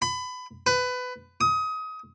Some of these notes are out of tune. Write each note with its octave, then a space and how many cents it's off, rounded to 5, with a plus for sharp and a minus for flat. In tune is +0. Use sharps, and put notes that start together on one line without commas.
B5 +25
B4 +20
D#6 +25